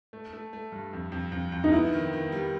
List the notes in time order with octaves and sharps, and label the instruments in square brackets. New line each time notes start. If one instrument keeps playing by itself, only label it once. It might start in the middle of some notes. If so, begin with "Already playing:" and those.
[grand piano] A3
A3
A3
G2
F2
F2
F2
F2
[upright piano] D#4
[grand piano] B3 [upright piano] E4
[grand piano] D#3
D#3
G3